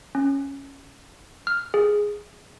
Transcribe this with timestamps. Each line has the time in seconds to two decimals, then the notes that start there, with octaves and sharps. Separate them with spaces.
0.15 C#4
1.47 F6
1.74 G#4